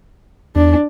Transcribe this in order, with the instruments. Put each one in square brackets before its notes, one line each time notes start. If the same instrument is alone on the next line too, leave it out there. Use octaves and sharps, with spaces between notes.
[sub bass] E2 [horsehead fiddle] D4